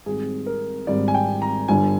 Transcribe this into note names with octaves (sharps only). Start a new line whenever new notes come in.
G#1 G#2 G3 C4 G#4
A#4
G#1 G#2 G3 C4 D5
G#5
G5
A#5
G1 G2 D3 G3 G#5